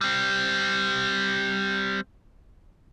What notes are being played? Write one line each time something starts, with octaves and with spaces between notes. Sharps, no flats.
G3 C4